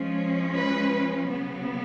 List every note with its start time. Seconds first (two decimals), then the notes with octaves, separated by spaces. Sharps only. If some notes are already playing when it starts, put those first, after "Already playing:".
Already playing: F3 G#3 C#4
0.55 B4
1.28 C#3 F#3 B3